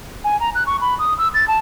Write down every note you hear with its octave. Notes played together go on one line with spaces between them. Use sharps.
G#5
A#5
F#6
C#6
B5
D#6
E6
A6
A5